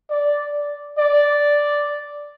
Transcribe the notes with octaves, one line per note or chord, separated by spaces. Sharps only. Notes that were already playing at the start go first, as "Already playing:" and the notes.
D5
D5